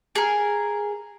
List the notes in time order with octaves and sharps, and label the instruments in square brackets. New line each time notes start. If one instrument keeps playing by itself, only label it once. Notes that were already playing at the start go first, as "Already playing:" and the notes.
[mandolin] G#4 A#4